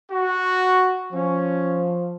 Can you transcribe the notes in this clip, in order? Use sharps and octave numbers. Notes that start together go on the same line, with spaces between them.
F#4
F3 C#4